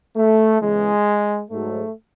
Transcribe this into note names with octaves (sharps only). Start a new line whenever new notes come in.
A3
E2 C#3 E3 G#3
G#2 F#3 A3